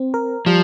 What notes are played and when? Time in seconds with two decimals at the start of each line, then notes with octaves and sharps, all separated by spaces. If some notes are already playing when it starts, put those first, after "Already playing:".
Already playing: C4
0.14 A#4
0.46 F3 G3